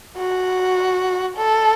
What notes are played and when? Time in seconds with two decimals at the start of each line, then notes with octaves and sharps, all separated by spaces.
0.17 F#4
1.37 A4